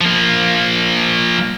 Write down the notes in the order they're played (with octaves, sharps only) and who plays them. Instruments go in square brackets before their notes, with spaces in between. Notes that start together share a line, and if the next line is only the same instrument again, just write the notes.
[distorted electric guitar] F3 A#3